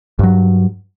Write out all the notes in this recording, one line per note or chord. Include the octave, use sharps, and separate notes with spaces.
G2 F#3